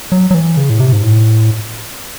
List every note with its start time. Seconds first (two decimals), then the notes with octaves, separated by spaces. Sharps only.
0.12 F#3
0.31 F#3
0.34 E3
0.57 C#3
0.70 A2
0.80 C3
0.92 G#2
1.03 A2